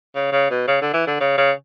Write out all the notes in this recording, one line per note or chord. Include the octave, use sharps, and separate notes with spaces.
C#3
C#3
B2
C#3
D3
E3
D3
C#3
C#3